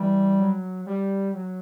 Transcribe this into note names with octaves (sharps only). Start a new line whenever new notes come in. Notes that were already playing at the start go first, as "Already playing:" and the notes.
Already playing: E3 G3
F#3
G3
F#3